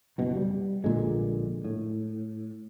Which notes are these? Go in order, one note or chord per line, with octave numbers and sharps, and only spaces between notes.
F#1 B2
G3
A#1 A#2 D3 G#3
A2